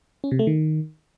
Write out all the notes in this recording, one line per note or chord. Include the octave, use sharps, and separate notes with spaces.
C#4
C3
A3
D#3